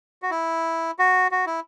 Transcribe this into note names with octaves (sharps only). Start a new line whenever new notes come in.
F#4
E4
F#4
F#4
E4